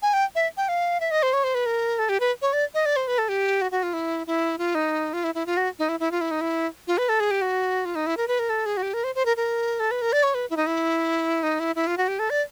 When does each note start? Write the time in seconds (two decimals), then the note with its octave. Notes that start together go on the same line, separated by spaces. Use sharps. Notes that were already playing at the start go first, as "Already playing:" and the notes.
0.02 G#5
0.13 G5
0.35 E5
0.57 G5
0.69 F5
1.00 E5
1.11 D#5
1.23 C5
1.33 C#5
1.44 C5
1.55 B4
1.66 A#4
1.99 A4
2.09 G4
2.20 B4
2.42 C#5
2.53 D5
2.74 D#5
2.86 D5
2.96 C5
3.08 B4
3.18 A4
3.29 G4
3.61 F#4
3.71 F#4
3.83 F4
3.93 E4
4.27 E4
4.58 F4
4.75 D#4
5.13 F4
5.24 E4
5.35 E4
5.46 F4
5.57 F#4
5.79 D#4
5.89 E4
6.00 E4
6.11 F4
6.21 E4
6.31 D#4
6.41 E4
6.87 F4
6.98 B4
7.09 A4
7.20 G#4
7.31 G4
7.42 F#4
7.85 F4
7.95 D#4
8.07 E4
8.17 A#4
8.28 B4
8.39 A#4
8.50 A4
8.66 G#4
8.77 F#4
8.83 G4
8.94 A#4
9.04 C5
9.15 C5
9.26 A#4
9.37 A#4
9.80 A4
9.91 B4
10.02 A#4
10.13 D5
10.23 C#5
10.34 B4
10.50 E4
10.57 D#4
10.67 E4
11.43 D#4
11.60 E4
11.76 E4
11.87 F4
11.98 F#4
12.08 G4
12.19 A4
12.30 D5